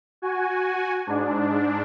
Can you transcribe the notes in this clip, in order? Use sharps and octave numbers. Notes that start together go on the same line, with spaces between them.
F#4 G#5
G#2 D4